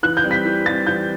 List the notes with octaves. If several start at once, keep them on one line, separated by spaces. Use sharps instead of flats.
E3 F#6
G6
G3 C4
B6
E3
G3 C4 A6
E3 G6